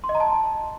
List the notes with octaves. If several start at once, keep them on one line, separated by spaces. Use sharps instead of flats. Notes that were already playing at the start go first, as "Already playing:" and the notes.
C6
D#5
A#5
A5